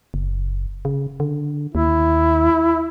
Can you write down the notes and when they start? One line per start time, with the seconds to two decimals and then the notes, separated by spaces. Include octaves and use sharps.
0.14 F#1
0.85 C#3
1.20 D3
1.75 D#2 E4